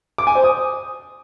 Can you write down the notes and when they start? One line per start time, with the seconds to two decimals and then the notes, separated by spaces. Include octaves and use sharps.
0.18 D6
0.27 G#5
0.35 C5
0.44 D#6